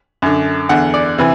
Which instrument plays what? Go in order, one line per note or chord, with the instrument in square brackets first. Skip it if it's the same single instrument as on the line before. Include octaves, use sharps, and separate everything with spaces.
[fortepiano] F#2 D3
E2 D3 F#5
D5
C3 E3